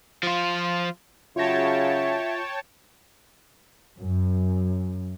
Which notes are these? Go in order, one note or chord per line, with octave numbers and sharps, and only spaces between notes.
F3 F4
C#3 F#3 F4 C#5 E5 G5 A5 A#6
F#2